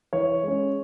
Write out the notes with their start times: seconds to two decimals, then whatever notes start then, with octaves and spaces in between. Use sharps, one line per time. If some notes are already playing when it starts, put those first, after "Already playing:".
0.13 E3 C#5
0.43 G#3 C#4